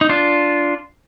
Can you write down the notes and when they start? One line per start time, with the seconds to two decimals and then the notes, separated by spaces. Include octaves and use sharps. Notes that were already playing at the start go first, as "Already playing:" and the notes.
0.01 D#4
0.09 D4 F4